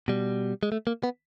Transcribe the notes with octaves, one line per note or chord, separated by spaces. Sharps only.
B2 G3
G#3
A3
A#3
B3